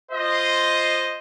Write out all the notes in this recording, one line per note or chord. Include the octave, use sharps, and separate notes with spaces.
F4 C5 D#5